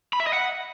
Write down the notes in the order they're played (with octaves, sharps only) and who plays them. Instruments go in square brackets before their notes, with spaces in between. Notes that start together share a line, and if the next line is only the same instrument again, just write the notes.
[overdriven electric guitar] B5
E5
D#5
F#5